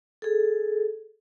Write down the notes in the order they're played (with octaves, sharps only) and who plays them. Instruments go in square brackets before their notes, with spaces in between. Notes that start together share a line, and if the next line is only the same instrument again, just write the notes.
[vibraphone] G#4 A4